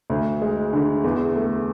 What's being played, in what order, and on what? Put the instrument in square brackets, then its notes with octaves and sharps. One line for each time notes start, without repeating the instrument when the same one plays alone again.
[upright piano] D2
G#3
D3
E2
A3